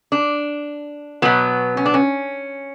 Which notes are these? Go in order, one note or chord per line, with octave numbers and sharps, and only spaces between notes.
D4
B2 F#3 B3
C#4
D4
C#4